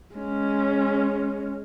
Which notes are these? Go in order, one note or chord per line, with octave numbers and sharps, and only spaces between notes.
G#3 C#4